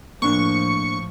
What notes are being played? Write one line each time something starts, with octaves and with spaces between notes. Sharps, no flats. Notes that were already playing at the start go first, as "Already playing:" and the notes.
A2 F3 A#3 C4 D4 C#6